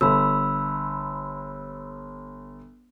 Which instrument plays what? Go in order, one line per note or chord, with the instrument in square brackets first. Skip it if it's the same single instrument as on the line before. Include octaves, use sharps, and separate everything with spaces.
[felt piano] G1 [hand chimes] B5 E6